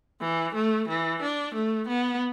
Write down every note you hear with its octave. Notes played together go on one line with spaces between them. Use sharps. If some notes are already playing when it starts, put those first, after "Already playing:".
E3
A3
E3
D4
A3
B3